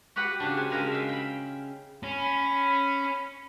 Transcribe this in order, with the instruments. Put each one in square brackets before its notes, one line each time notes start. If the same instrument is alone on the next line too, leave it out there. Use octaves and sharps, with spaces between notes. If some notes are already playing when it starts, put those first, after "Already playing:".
[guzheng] F#4 G4 B4 F#5 B5
C#3 D4
C4 D4 G#5
C#3 G#3 A#4 G#5 B5
E5 F5 G5
G5 B5
[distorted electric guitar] C#4 [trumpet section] B5